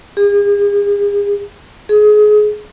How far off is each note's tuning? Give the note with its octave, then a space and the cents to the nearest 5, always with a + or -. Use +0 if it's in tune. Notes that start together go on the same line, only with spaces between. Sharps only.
G#4 -40
G#4 +25